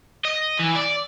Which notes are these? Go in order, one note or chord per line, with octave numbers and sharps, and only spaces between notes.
D#5
E3
D5